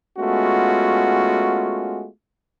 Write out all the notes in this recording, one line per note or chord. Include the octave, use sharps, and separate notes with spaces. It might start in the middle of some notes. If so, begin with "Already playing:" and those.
G#3 A3 B3 C#4 F4 F#4